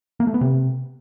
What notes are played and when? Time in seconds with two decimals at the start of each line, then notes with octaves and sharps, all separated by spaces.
0.20 A#3
0.27 A3
0.34 B3
0.41 C3